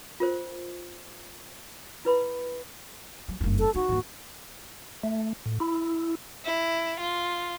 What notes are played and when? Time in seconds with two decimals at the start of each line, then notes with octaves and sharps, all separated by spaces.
0.20 F4 A#4 C5
2.05 E4 B4 B5
3.28 F#3
3.41 F#1 G2
3.59 A4
3.75 D#4 F#4
3.88 D#2 G#2
5.03 A3
5.46 A2
5.60 E4
6.44 E4
6.99 F4